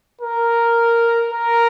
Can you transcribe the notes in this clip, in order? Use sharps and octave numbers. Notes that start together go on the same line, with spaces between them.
A#4
A#4